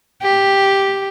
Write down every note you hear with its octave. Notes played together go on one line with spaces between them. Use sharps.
G4